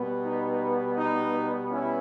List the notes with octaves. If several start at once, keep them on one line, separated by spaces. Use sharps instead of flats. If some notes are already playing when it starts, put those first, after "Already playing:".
Already playing: B2 G3 B3
D#4
D#4
C#4 E4